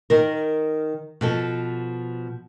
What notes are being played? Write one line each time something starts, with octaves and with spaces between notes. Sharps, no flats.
D#3 A#4
B2 F3 A4